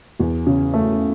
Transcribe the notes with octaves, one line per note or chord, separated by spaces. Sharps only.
E2
C#3
A3